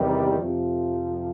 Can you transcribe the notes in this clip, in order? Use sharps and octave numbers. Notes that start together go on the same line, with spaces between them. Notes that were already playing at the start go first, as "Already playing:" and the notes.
Already playing: E2 C3 D#3 G3
F2 C3 F3